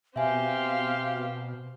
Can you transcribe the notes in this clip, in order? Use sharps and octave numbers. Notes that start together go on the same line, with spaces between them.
B2 C4 G4 E5 F5 G#5